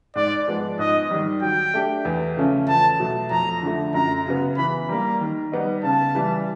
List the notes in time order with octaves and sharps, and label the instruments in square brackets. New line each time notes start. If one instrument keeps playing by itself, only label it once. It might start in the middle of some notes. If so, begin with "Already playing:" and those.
[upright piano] G#2 [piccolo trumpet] D5
[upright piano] F3 G#3 B3
[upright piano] G#2 [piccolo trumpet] D#5
[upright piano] D#3 G3
[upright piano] F#3 [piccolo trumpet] G5
[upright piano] A3 D4 G4
E2
C#3 F3 A3 C#4
[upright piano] E2 [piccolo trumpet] A5
[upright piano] B2 F#3 A3
[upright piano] F2 [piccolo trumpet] A#5
[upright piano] D3 F3 A3
[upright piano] F#2 [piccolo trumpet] A#5
[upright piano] C#3 F#3 B3
[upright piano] E3 [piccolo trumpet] B5
[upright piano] G3 A#3 [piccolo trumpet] A#5
[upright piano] D#3
G3 B3 D#4
[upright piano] C#3 [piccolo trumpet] A5
[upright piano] E3 G3